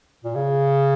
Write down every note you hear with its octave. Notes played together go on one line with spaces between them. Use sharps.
A#2
C#3